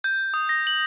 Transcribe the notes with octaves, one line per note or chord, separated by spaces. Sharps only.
G6
D#6
A#6
F#7